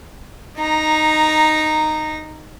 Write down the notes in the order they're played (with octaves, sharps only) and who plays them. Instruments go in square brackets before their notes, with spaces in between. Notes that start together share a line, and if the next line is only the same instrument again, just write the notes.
[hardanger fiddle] D#4 A#5